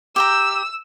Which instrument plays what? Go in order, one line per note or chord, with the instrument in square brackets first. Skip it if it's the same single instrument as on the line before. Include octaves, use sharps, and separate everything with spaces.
[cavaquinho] G4 G5 A#5 [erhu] E6